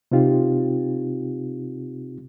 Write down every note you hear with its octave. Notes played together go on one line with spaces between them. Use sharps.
C3 C4 D#4 F4 G4